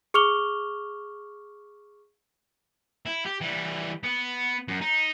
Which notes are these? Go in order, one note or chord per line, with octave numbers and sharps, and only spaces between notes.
G#4 C#6 D6 F6 F7 G7
E4
G4
E3 G3
B3
F#2
D#4